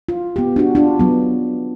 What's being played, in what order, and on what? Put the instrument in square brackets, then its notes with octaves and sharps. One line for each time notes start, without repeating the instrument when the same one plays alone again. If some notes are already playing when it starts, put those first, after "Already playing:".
[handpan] F4
B3 G4
D4 F#4
D4 F4 F#4
F#3 B3